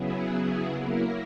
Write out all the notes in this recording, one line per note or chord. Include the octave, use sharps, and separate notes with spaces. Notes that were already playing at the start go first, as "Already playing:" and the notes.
Already playing: C#3 F#3 B3 E4 G#4
F#3 A#3 E4 A#4